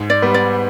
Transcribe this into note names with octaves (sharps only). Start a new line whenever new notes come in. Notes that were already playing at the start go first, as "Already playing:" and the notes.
Already playing: G#2
D5
G3 B3
D5